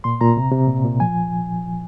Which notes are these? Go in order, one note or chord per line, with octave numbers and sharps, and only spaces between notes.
A#2 C6
A#2 A#5
C3
C3
A#2
A#2
F3 G#5